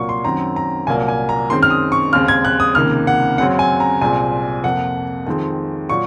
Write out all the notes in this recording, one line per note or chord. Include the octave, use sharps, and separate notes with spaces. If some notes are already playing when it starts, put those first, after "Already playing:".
Already playing: C2 A#2 F#3 A#3 C#6
C6
F#2 D#3 F#3 C4 A#5
A#5
C2 A#2 F#3 A#3 G#5
G#5
A#5
F#2 D#3 G#3 C4 C6
F6
D#6
C#6
D#2 C#3 G#3 C4 F6
G#6
F#6
D#6
C#2 C3 D#3 A#3 F6
F#5
F#2 C#3 F#3 C4 F#5
G#5
A#5
C2 A#2 G#3 C4 G#5
F2 C3 F3 A#3 F#5
F2 D#3 G#3 C4
A#2 F#3 C#6